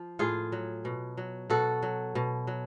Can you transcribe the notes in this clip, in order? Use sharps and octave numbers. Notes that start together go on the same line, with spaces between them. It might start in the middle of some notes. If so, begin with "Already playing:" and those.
Already playing: F3
A2 F4 G#4
F#3
B2
F#3
B2 F#4 A4
F#3
B2
F#3